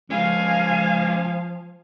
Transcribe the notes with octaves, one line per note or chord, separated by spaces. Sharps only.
F3 G#3 C#4 F5 G#5